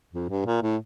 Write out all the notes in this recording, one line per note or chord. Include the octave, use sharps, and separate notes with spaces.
F2
G2
A#2
A2